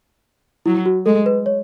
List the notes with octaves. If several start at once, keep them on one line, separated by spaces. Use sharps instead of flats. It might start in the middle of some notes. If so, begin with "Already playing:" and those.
F#3 E4
F#4
G#3 A4
B4
C#5